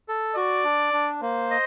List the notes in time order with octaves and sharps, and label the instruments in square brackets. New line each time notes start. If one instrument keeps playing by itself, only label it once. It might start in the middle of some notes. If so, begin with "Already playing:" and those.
[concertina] A4
[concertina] F#4 [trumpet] D5
[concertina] D4
D4
[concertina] A#3 [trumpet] C5
[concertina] D#5